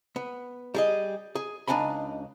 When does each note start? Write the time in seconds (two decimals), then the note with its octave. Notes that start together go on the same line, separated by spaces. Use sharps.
0.16 B3
0.74 G3 G#4 D#5
1.35 G#4
1.68 C#2 D4 D#4 G#5 B5